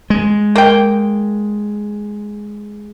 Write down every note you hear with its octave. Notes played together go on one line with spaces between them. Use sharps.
G#3
A#3 G5